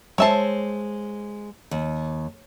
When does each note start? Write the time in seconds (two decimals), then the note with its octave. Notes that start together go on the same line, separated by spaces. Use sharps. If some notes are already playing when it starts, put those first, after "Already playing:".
0.18 G#3 C5 C#5 E5 A5
1.71 D#2